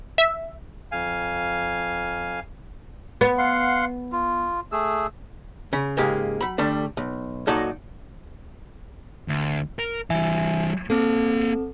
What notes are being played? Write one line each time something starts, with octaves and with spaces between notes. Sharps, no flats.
E5
F2 F5 G#5
B3
F5 F#5 C6
F4
A3 G#4 E6
C#3
G#2 C#3 G#3 A#3 G4
F#3 B5
D3 G3 A3 D4
B1
A#2 F#3 D#4 F#4 A4 D5
D2
A#4
E3 G3 E5 G#5
A#3 C4 A4 A5